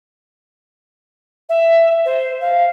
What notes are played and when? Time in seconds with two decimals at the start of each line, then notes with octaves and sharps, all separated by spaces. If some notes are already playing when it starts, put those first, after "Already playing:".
1.49 E5
2.05 C5
2.41 F5